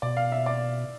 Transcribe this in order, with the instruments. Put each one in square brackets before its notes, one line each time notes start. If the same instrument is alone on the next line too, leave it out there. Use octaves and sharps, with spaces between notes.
[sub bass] B2 [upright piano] D5
[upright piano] F5
E5
D5